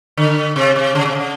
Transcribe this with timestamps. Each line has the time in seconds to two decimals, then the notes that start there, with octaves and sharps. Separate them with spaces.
0.17 D3
0.56 C3
0.76 C3
0.95 C#3
1.05 C3
1.15 C#3